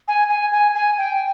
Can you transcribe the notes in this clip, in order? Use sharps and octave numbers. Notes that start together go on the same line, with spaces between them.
G#5
G#5
G#5
G#5
G5